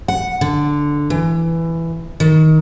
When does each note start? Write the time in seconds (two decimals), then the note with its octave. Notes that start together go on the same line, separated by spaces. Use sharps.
0.08 F#5
0.41 D3
1.10 E3
2.20 D#3